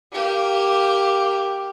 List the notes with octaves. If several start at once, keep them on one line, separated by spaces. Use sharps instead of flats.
A#3 G4